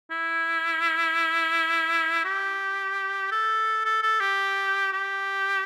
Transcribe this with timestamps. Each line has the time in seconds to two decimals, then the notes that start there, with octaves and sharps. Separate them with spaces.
0.11 E4
2.24 G4
3.32 A4
3.85 A4
4.03 A4
4.21 G4
4.93 G4